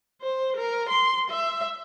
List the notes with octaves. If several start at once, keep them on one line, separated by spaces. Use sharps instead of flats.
C5
A#4
C6
E5